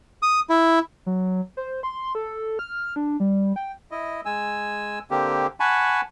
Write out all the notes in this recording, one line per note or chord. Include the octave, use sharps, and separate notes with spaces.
D#6
E4
F#3
C5
C6
A4
F6
D4
G3
G5
E4 D#5
G#3 G#5 E6
D3 A#3 C4 G4
F#5 G#5 A5 B5 C#6